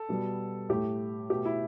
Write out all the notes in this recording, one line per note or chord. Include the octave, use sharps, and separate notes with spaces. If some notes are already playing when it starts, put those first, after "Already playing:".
Already playing: A4
B2 G3 B3
A2 A3 G4
B2 A3 G4
E4